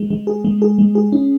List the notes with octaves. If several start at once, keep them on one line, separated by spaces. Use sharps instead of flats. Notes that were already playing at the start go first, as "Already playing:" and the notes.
Already playing: G#3
G#3
G#4
G#3
G#4
G#3
G#4
C#4